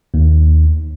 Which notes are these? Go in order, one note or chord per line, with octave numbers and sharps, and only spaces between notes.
D#2